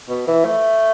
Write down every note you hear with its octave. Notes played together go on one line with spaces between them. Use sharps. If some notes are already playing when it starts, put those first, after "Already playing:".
B2
E3
A3